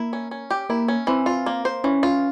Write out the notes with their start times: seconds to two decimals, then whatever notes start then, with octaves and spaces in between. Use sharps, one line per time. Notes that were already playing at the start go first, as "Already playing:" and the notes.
Already playing: A#3 E4
0.13 C#4
0.31 C#4
0.50 G4
0.69 A#3 E4
0.88 C#4
1.07 E3 C4
1.26 F4
1.46 A#3
1.65 C5
1.84 E3 C#4
2.03 F4